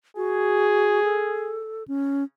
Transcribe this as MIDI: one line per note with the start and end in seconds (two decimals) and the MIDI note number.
0.17 1.02 66
0.17 1.62 68
1.04 1.84 69
1.88 2.24 61